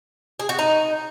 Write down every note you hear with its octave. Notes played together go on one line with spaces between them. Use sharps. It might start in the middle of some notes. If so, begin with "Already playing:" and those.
G#4
F#4
D#4